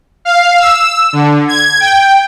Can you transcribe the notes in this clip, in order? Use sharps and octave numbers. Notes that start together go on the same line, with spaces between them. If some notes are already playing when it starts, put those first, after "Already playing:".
F5
E6
D3
G#6
G5